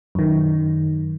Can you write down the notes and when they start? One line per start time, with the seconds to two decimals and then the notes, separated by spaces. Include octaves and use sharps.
0.15 F#2 D#3